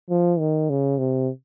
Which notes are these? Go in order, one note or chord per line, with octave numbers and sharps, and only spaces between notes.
F3
D#3
C#3
C3